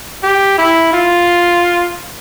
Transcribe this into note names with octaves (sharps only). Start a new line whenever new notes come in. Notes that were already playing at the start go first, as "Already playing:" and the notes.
G4
E4
F4